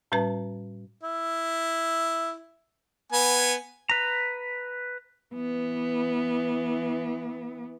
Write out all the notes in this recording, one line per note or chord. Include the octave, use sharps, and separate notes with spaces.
A2 G3 C#4 B4 A5
E4
B3 G#5
B4 A#5
E3 B3